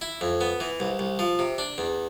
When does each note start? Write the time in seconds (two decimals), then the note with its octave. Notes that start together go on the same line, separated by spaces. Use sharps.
0.01 E4
0.21 F2
0.41 B3
0.60 E3
0.80 C2
0.99 C2
1.19 F3
1.39 C3
1.58 D4
1.78 E2